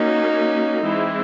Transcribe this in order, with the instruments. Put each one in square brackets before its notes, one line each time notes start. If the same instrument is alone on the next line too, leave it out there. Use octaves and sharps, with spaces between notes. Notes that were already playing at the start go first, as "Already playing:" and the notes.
Already playing: [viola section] A#3 C#4 F#4 [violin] D#4
[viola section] E3 G#3 C4 E4